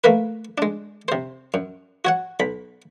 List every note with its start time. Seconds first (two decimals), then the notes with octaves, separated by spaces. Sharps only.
0.04 A3 A#3 A#4 B4
0.58 G#3 D4
1.08 C3 C5
1.54 F#2
2.05 F#4 C#5 F#5
2.40 B1 B5